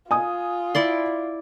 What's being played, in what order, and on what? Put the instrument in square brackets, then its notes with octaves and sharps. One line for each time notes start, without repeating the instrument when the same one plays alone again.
[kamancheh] F4 [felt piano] G#5 D#6
[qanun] E4 D5 C6